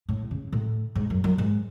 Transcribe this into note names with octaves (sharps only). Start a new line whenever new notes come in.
A2
C#3
A2
G#2
F#2
F#2
G#2